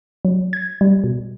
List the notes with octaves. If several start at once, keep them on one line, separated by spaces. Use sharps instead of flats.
F#3
G#6
G3
B2